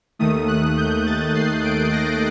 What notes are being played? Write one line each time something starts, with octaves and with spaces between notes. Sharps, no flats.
D#2 D#3 A3 D#6
F#6
G6
A6
C7
D7
A#6